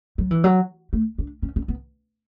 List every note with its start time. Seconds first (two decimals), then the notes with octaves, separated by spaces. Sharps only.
0.18 F#3
0.31 E3
0.44 F#3
0.93 A3
1.18 D4
1.42 C#4
1.56 C#4
1.68 B3